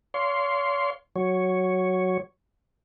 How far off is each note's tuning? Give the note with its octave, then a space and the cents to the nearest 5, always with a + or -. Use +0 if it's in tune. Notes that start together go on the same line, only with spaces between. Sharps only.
C#5 +40 F5 +0 C6 +0
F#3 +0 C#5 +0